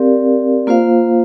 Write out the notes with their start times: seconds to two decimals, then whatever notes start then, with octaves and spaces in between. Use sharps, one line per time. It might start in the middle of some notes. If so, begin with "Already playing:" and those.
Already playing: C4 G4 A#4 D5 F5
0.67 A#3 F4 C5 F5